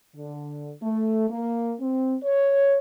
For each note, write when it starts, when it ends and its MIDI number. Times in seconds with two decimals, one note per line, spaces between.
0.16 0.72 50
0.82 1.27 57
1.30 1.74 58
1.80 2.16 60
2.23 2.79 73